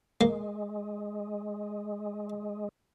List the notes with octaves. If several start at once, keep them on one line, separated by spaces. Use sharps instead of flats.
G#3 A#3